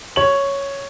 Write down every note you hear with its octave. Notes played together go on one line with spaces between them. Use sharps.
C#5 F#7